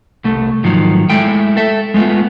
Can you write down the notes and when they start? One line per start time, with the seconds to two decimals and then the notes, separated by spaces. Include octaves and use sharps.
0.24 C2 A3
0.63 G#2 D#3 F3 F#3
1.10 G#3 A3 E4 G5
1.57 A4 E5
1.94 G#3 A3 B3 F4